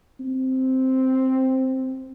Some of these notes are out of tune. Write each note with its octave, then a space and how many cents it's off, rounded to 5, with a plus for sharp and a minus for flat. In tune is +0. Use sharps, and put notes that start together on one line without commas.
C4 +0